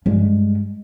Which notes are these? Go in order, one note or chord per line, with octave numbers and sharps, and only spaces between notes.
G2 G#3